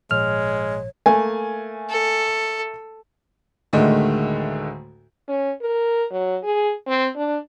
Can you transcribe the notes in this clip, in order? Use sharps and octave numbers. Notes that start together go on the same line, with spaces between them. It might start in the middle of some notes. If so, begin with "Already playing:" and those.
G#1 A#2 F3 G#3 C#5 F6
A3 A#3 G#5
A4
D2 A2 D3 D#3 G#3 A3
C#4
A#4
F#3
G#4
C4
D4